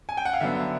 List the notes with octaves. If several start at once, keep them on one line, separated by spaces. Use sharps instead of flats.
G#5
G5
F#5
F5
D3 F#3 B3 E5